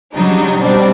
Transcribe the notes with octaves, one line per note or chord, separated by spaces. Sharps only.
C#3 F#3 G3 D4 D#4
B2 G3 C4 D4